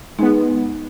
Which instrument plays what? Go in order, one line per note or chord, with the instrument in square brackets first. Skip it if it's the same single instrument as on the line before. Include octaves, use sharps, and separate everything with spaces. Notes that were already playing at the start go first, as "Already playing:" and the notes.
[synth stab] G#3 B3 [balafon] D#4